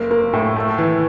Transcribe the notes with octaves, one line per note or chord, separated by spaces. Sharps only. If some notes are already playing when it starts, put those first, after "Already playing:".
Already playing: F#1 A#3
A#3
A2
A3
E3